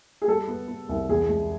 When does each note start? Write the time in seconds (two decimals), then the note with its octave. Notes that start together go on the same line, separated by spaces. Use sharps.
0.22 G#4
0.28 G3 A4
0.48 B3
0.68 B3
0.89 C2
1.09 E2 G#4
1.29 G#3